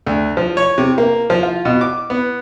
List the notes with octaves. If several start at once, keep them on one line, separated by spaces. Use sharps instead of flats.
D2
F3
C#5
C3
A#3
F3
F4
B2
D6
B3